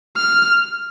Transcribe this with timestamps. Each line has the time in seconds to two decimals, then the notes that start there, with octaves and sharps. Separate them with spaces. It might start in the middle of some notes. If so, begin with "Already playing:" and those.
0.16 F6